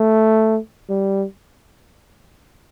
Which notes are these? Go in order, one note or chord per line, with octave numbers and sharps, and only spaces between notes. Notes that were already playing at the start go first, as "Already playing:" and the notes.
Already playing: A3
G3